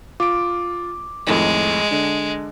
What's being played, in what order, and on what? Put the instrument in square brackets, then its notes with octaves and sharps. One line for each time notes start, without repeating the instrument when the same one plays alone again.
[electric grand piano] F4 D7 [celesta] D6
[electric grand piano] F2 A2 D#3 [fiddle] G#3
[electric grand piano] D3 D4